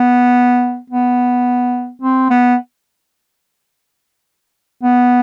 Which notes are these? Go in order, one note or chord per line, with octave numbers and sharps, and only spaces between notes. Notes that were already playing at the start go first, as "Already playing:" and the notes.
Already playing: B3
B3
C4
B3
B3